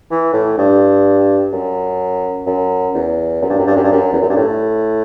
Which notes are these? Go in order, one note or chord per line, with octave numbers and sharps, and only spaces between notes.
E3
A2
G2
F#2
F#2
E2
F#2
G2
F#2
G2
F#2
G2
F#2
E2
F#2
G2
A2